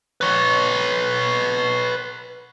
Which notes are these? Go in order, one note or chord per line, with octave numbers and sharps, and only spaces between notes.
B4 C#5